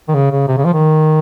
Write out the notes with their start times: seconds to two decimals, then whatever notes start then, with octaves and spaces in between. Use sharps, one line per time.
0.08 D#3
0.14 C#3
0.31 C#3
0.48 C3
0.57 C#3
0.65 F3
0.74 D#3